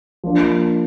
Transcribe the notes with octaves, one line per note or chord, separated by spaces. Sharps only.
F3 A#3 D4